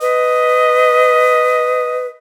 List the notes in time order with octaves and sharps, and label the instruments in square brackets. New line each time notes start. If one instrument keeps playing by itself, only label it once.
[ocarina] B4 [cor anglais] D#5